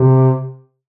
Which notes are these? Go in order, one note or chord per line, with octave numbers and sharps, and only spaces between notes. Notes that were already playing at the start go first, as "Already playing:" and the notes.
Already playing: C3